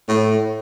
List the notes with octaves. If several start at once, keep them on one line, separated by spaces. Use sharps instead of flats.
A2